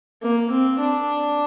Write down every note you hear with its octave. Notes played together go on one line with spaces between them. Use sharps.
A#3
C4
D4